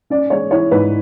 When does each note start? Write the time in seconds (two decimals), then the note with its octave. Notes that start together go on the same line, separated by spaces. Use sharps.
0.10 C#4 D5
0.30 G#3 C#5
0.51 E4 C#5
0.71 G#2 B4